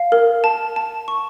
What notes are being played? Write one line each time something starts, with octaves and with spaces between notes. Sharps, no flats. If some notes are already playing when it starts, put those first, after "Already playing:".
Already playing: F5
A#4
A5
A5
C#6